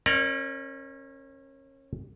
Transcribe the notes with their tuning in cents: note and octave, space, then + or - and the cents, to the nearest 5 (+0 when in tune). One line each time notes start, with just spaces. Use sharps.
C#4 -30 A#4 +0 D5 +35